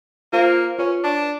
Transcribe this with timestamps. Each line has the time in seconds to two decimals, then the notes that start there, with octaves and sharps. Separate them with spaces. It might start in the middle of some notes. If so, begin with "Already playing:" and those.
0.33 A#3 F4 C5
0.79 C#4 F4 B4
1.04 D4